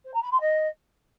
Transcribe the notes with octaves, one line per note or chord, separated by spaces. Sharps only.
C5
A#5
B5
C6
D#5